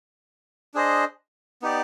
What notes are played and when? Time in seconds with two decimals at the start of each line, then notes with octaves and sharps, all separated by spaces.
0.74 D4 G#4 C5 D#5
1.62 B3 D#4 G4 D5